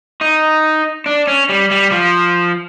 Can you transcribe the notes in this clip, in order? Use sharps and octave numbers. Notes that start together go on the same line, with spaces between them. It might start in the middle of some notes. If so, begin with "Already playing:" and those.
D#4
D4
C#4
G3
G3
F3